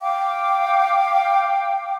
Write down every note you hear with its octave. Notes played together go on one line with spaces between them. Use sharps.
F5 G5 D6